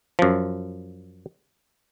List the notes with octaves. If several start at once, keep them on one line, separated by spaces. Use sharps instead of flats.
F#2 F3